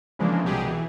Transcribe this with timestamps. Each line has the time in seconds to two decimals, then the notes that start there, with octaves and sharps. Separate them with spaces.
0.19 C#3 E3 F3 G#3 A#3 D4
0.44 C2 B2 F#3 G4 G#4
0.66 E3